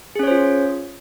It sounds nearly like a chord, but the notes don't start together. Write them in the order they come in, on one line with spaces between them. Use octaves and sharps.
G#4 C#4 C#5 C5 F4